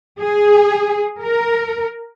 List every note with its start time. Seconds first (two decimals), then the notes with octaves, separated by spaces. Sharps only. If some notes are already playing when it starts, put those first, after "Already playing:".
0.19 G#4
1.21 A#4